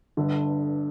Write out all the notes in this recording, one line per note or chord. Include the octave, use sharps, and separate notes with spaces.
G1 G2 D3